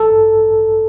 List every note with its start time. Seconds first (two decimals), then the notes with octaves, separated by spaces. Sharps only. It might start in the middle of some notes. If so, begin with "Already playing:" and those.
Already playing: A1 A4
0.11 G2
0.42 A1